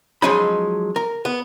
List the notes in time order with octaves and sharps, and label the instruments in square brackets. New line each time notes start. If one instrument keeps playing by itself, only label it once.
[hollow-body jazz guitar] F3 F#3 G#3 C#4 D#4 B5
A#4
B3